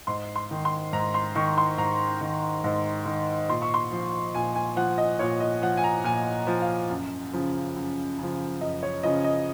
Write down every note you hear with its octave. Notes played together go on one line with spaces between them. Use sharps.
G#2 C6
C6
D#3
C6
G#2 A#5
C6
D#3 C#6
C6
G#2 A#5
D#3
G#2
D#3
A#2 C6
C#6
C6
F3
A#2 G#5
G#5
F3 F#5
D#5
A#2 C#5
D#5
F3 F#5
G#5
A#5
A#2 G#5
F3
F5
F#2
C#3 F3
F#2
C#3 F3
F#2 D#5
C#5
C#3 F3 D#5
D#5